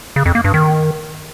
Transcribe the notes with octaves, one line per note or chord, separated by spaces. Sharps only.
C#3
F2
A#3
G2
D#3